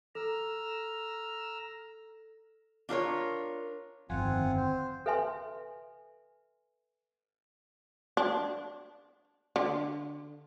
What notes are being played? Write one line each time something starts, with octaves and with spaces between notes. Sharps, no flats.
A4 A#5 E6 F6
D4 F4 A#4 C#5
G1 F2 D#3 C4 F4 F#5 G#5
C5
A4 B4 E5 G#5 C6
D4
D3